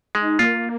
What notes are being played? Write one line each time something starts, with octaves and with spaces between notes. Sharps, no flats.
G#3 D#4
A#3 F4